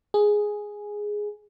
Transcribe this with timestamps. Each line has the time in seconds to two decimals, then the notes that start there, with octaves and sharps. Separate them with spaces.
0.14 G#4